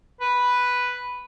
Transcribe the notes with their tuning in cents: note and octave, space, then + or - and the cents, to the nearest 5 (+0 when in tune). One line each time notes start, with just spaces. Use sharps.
B4 +0